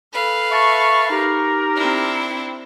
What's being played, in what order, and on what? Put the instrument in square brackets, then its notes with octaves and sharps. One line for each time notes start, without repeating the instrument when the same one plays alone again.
[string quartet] A4 B4 F5
[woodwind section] E5 A5 C#6
D#4 G4 A#4
[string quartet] C4 D4 E4